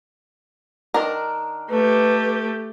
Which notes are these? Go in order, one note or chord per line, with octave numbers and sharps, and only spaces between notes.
D#3 D4 A#4
A3 G4 B4